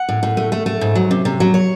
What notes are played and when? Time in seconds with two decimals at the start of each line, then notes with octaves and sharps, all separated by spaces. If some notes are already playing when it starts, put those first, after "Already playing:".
Already playing: F#5
0.09 A2
0.23 A2
0.37 A3
0.52 A3
0.66 A3
0.81 G#2
0.95 F#3
1.11 C3
1.25 C3
1.40 F#3
1.54 C#5